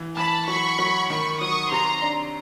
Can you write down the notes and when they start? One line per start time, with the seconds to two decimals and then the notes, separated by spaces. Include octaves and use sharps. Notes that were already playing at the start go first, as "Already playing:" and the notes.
Already playing: E3
0.17 E3 A5 B5
0.48 F#3 B5 C#6
0.79 F#3
1.10 D#3 B5 C#6
1.41 F#3 C#6 D#6
1.71 C3 A#5 C6
2.02 D4